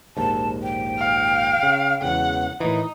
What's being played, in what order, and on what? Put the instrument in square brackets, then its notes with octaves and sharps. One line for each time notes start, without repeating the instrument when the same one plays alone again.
[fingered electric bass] A#1 D#2 G#2 [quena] A5
[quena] G5
[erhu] F5
[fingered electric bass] C#3
[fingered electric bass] E1 E2 C#3 [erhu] F#5
[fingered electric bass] A2 D#3 E3 [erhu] D#4